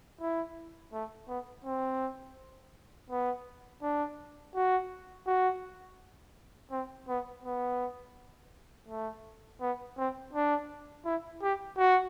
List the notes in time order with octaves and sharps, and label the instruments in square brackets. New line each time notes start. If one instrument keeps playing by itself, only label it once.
[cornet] E4
A3
B3
C4
B3
D4
F#4
F#4
C4
B3
B3
A3
B3
C4
D4
E4
G4
F#4